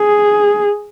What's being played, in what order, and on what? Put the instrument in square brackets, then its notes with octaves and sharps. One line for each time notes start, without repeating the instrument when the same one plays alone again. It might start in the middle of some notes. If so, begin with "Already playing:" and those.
Already playing: [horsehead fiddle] G#4